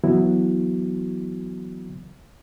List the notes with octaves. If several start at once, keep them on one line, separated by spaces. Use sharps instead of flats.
E3 F#3 B3 E4 F#4